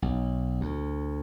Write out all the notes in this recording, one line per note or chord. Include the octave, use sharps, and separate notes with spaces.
B1
D2